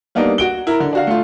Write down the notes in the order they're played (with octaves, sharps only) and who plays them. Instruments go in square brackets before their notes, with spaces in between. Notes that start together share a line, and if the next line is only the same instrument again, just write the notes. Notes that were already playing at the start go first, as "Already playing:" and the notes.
[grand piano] G3 A#3 B3 D4 D#4
F#4 D7 G7
E4 A#4
D3
D4 F#4 F5
A3 F4